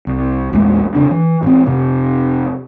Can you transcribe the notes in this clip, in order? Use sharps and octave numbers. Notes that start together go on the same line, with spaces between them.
C2
A#1 E2 G#3 A3
F1 C#3 D4
E3
A1 C4
F1 C3